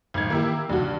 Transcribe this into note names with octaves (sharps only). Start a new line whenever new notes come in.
G#1 F#2 A2 G#6
D#3 E3 A#3 E4 G4
E2 G2 C3 F3 F#4
D#2